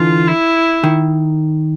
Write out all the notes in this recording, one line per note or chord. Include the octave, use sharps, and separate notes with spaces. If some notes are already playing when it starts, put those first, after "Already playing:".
Already playing: D3 E3 F4
E4
D#3